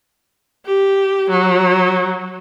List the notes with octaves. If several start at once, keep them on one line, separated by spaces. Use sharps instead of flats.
G4
F#3